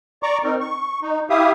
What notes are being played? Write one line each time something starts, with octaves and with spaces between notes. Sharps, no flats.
D5 A#5 C#6 D6
C4 D#4 A#4
C#6
D#4
E4 G4 E5 F5 D#6